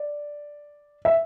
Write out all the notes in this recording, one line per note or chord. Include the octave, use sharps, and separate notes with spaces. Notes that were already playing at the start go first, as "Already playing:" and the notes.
Already playing: D5
E5